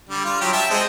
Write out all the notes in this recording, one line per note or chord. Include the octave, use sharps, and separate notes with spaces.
D3 G3
F4
F#3 G3 G4
E5 G5 A5
G#3 C4 D#5